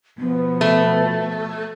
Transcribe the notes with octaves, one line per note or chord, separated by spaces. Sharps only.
B2 F3 B3
A3